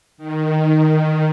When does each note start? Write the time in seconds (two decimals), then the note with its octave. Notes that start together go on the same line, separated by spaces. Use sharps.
0.18 D#3